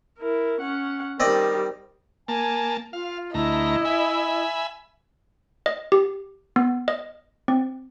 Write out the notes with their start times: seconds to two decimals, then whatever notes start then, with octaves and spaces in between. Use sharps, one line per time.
0.18 E4 A#4
0.60 C#4 F#5
1.20 D#3 G3 C4 D5 D#5
2.28 A#3 G#5 A5
2.93 F4 F5
3.34 D2 A3 E4 D#5 A#5
3.85 E5 G#5 B5
5.66 D#5
5.92 G4
6.56 B3
6.88 D#5
7.48 C4